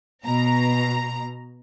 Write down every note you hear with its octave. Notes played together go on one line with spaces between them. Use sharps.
B2 A#5